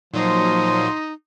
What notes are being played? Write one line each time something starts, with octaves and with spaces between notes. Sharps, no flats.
A#2 F3 F#3 D#4 C6